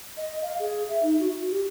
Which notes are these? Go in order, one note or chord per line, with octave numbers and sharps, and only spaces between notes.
D#5
F5
G#4
E5
D#4
F#4
G4